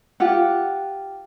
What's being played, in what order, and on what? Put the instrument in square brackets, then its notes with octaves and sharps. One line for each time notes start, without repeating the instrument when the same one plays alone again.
[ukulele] F4 G4 F#5